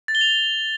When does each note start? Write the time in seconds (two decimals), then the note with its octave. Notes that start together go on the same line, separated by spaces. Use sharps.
0.08 A6
0.15 G7
0.21 F7